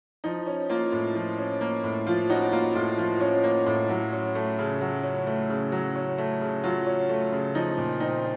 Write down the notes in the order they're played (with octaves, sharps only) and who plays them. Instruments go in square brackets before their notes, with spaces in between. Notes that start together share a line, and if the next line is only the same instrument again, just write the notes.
[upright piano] F3 D#4
C#4
A#3 F4
A2
F3
C#4
A#3
A2
F3 F4
C#4 D#4 F#4
A#3 F4
A2 F4
F3 F4
C#4
A#3
A2
F#3
C#4
A3
C#3
F#3
C#4
A3
C#3
F#3
C#4
A3
C#3
F#3 F4
C#4
A3
C#3
F3 D#4
A#2
C4 D#4